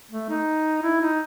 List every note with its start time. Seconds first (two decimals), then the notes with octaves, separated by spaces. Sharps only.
0.11 A3
0.29 D#4
0.83 E4
1.01 D#4